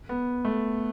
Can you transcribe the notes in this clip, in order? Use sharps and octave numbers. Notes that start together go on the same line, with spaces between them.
B3
A3